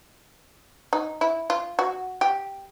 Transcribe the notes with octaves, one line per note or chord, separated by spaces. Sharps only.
D#4
E4
F4
F#4
G4